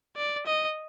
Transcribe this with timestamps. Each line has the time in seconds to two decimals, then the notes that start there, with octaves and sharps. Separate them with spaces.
0.17 D5
0.46 D#5